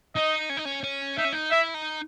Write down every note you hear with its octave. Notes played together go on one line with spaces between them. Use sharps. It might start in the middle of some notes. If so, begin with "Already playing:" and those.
D#4 D#5
C#4
D#4
C#4
C#4
D#4 E5
C#4
D#4
E4 E5
D#4